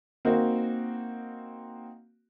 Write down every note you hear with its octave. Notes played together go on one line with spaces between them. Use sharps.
A#3 C4 D#4 F#4